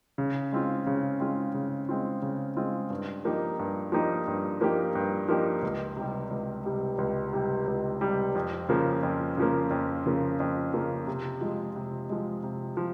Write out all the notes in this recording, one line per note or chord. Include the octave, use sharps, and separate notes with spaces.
C#3
G#3 C4 F4
C#3
G#3 C4 F4
C#3
G#3 C4 F4
C#3
G#3 C4 F4
G2
F3 A#3 D#4 G4
G2
F3 A#3 D#4 G4
G2
F3 A#3 D#4 G4
G2
F3 A#3 D#4 G4
C#2
C3 G3
C#2
C3 G3
C#2
C3 G3
C#2
C3 G3
F2
C#3 F3 A#3
F2
C#3 F3 A#3
F2
C#3 F3 A#3
F2
C#3 F3 A#3
C3
F3 G#3
C3
F3 G#3
C3
F3